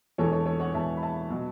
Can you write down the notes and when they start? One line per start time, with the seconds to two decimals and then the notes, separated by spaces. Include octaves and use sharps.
0.18 E1 E2 E3 A4 C#5
0.32 A4 C#5
0.46 A4 C#5
0.60 C#5 F#5
0.74 E1 E2 E3 E5 A5
0.97 B5
1.02 E5 A5
1.30 B2 F#3